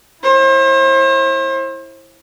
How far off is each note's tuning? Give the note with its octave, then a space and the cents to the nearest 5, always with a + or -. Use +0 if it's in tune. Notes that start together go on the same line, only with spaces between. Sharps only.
E4 +0 C5 +40